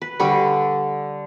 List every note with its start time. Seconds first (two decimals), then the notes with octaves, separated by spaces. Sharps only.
0.02 B4
0.20 D3 G3 B5 C#6